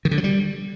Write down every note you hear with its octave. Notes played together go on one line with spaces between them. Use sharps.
D#3
D3
F#3
G3